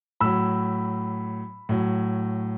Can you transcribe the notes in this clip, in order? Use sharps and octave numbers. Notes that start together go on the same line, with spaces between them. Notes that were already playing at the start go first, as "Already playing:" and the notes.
A2 F#3 B5 E6
A2 F#3